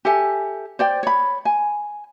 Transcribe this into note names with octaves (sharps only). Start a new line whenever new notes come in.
G4 A4 E5 G#5
C5 D5 G5
C#5 B5
G#5